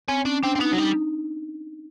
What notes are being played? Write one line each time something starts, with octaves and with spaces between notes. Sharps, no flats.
C4 C#4
C#4 D4
C4 D4
C4
B3 D#4
F#3
G3 D#4